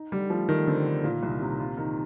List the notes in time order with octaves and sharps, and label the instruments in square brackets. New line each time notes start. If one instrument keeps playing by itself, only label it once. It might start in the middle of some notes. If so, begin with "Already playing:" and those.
Already playing: [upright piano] D#4
[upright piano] D3 [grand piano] G3
[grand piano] F3 [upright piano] A3
[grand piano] D#3 [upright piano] A3
[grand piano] D3 [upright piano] C4
[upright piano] D3
[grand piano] A#2 [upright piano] D#3
[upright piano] C2
C3
F4
D#3